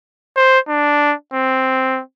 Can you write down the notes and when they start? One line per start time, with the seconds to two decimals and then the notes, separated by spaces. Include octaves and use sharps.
0.36 C5
0.68 D4
1.33 C4